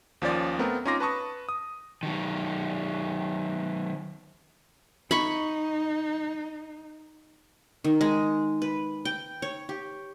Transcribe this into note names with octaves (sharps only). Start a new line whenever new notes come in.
D#2 F3 C#4 D5 A6
A3 B3 C4 A#4
C#4 D#4 F4 C6 D6 A#6
B4 A5 C#6 D#6
D#6
D#3 F#3
D#4 B5 C#6
D#3
G#3
B4
G5
C#5
G4